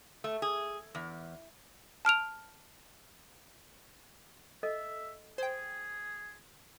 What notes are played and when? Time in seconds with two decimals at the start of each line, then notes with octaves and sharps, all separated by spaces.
0.24 A3
0.42 G#4
0.95 E2
2.05 A5 F6 D7 F7
4.63 A4 D#5 E5
5.38 G#4 C5 G5